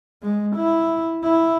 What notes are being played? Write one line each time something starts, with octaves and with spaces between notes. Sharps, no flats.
G#3
E4
E4